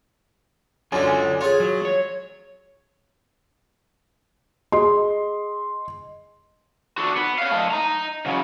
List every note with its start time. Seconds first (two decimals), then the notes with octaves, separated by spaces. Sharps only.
0.92 F#2 D3 F4 C#5 G#5
1.41 F4 G#4 C#5
1.60 F#3
1.85 C#5
4.72 G#4 D#5 C6
6.98 F#4 A4
7.16 B3
7.38 C#5 F5
7.51 A3 D#5
7.71 D#5 A#5
8.26 C#3 F#3